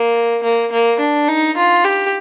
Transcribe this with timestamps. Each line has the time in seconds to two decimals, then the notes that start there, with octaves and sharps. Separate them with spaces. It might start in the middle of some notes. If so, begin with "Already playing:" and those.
Already playing: A#3
0.43 A#3
0.72 A#3
1.00 D4
1.28 D#4
1.57 F4
1.84 G4